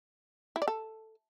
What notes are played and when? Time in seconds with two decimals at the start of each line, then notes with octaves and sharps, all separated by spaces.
0.56 E4
0.62 D5
0.68 A4